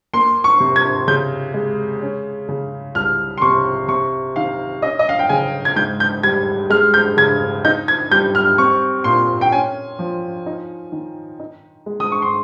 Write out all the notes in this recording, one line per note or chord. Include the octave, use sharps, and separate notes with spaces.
A#3 C6
C#6
C3
G#6
C#3 G6
G#3
C#4
C#3
C2 F6
C6
C3 C#6
C3 C#6
D#3 F5
C#4 D#5
D#5
F5
G5
C#3 G#5
G#6
G#2 G6
G6
G3 G#6
G#3 F6
G6
C#3 G#6
D#4 G6
G#6
G3 G6
F6
C4 C#6
A#2 C6
G5
C#4 G#5
F3
D#4
D#3
D#4
G#3
D#6
C#6
C6